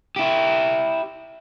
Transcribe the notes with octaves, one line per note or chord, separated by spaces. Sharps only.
E4 G4